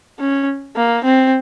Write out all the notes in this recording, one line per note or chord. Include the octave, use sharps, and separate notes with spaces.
C#4
A#3
C4